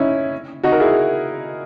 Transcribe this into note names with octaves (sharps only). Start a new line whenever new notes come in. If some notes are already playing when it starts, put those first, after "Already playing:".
Already playing: C#4 D#4 E4
D#4 F#4
A#4
E4 G#4